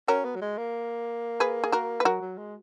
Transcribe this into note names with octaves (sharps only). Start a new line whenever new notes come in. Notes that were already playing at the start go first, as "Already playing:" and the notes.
C#4 F#4 A#4
B3
F#3
G#3
A#3
G#4 B4
G#4
F#4 A#4
B4
F#3 F#4 A#4
F#3
G#3